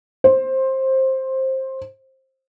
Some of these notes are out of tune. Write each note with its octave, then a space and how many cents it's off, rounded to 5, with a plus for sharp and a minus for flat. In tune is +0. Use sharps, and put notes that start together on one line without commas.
C5 +15